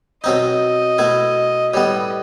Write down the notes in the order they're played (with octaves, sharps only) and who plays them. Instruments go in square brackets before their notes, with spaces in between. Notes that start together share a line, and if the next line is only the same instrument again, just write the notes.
[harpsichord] B2 F#3 C4 D#4 [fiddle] D#5
[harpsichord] B2 A3 E4
[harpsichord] A2 G3 B3 [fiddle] D#5